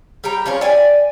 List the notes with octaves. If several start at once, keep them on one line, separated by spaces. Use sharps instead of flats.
G3 G4 G5 A#5
F3 C#4 G#4 C#5
D5 G5 G#5